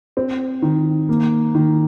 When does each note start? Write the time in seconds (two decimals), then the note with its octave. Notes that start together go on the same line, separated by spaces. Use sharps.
0.17 C4
0.62 D#3
1.09 A#3
1.55 D#3